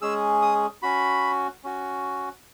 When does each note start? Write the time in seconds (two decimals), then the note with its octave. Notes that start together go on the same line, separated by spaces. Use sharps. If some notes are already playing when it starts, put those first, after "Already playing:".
0.01 G#3 C#4 G#4 E6
0.42 D#6
0.82 C#4 F#4 B5
1.64 C#4 F#4